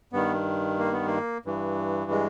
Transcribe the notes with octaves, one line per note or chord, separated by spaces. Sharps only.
G2 D#3 B3
A#3
B3
A#3
G2 E3
G#3